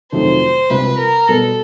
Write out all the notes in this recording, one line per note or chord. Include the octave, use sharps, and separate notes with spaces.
F2 C3 D#3 F#3 A3 C5
C2 C3 F3 G#3 B4
A#4
B2 G3 B3 A4